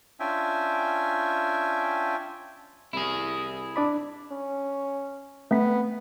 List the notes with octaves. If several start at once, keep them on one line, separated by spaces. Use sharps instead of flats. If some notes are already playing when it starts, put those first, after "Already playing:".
C#4 D4 F4 E5 G5 G#5
C2 E4 G#4
D4 D5 B5
C#4
A3 B3 C4 B6